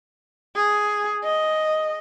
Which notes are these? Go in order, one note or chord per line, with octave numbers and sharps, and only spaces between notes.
G#4
D#5